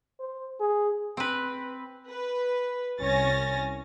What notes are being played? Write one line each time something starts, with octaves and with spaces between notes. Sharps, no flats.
C5
G#4
C4 B4
B4
C2 C#4 C#5 G#5 A6 A#6